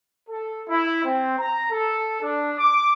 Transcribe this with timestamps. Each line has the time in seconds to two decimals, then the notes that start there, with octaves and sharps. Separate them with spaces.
0.30 A4
0.68 E4
1.05 C4
1.39 A#5
1.71 A4
2.22 D4
2.58 D6